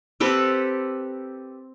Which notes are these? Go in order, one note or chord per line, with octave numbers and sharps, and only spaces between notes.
C4 G4 A4 B4